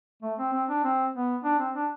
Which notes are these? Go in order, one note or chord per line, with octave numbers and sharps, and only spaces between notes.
A3
C4
C4
D4
C4
B3
D4
C4
D4